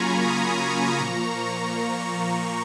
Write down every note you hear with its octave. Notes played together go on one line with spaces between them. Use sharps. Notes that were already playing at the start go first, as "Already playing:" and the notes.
Already playing: C#3 F#3 A#3 F4 G#5 A#5 B5 C#6
B5 D#6
A#2 F3 A#3 A#5 C#6